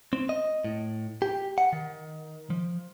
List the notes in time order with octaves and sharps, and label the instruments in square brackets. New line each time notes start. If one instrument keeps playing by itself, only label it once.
[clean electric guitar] C4
D#5
A2
G4
F#5
D#3
F3